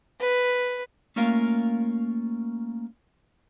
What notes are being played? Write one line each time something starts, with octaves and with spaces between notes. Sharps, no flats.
B4
A3 A#3 C#4 F4 A#4 F5